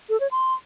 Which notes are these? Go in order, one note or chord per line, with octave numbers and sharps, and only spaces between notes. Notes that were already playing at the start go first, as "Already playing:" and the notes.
A4
C#5
C6